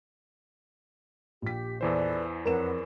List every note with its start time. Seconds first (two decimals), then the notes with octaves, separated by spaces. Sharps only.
1.42 A#1 G4 B6
1.81 E2 E3 A4 B4 C5 D5
2.46 F2 A#4 B4 C#5 F#5 E7